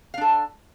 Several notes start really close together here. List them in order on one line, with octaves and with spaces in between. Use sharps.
F5 D4 A4